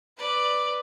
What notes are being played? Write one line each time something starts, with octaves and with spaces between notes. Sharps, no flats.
B4 D5